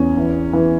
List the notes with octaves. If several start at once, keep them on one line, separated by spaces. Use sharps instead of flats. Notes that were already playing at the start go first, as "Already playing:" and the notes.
Already playing: E2 C#4
E3
E3